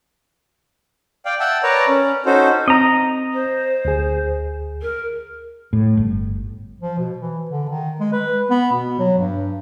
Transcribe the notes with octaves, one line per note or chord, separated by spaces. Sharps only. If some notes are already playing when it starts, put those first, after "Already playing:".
D5 F5 G5
E5 F#5 G5 A5
A#4 B4 C#5 D5 A5 A#5
C#4
C#4 D#4 F#4 A4 C5
C4 D#5 A#5
C5
D2 G#4
A#4
A2
G1
F3
B2
E3
D3
D#3
G#3
B4
B3
B2
F#3
G2